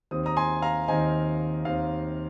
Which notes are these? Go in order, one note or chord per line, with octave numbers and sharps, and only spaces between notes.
D#2 D#3 C4 D#6
A#5 D#6
G#5 C6
F5 A#5
D#2 D#3 C4 D#5 G#5
D#2 D#3 C4 F5